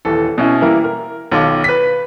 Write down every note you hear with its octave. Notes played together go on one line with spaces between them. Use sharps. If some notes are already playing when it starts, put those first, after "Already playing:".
D#1 E3 A4
B2 C#4 E4
E3 G3 A#3 E4 A#4
A#4
B1 D#3 F4 D6
B4 B6